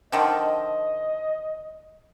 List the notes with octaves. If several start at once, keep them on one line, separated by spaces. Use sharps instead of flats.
D3 D#3 F3 D#5